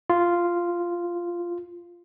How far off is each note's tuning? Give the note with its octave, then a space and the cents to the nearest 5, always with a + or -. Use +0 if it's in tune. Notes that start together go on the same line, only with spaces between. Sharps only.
F4 -5